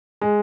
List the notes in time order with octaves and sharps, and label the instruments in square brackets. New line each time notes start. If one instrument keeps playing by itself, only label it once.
[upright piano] G#3